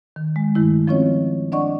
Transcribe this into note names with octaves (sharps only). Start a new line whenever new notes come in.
D#3
G#3
G2 D#3 A3 E4
F3 C4 C#4 F4 C#5 D#5
D4 D5 D#5 F#5 C#6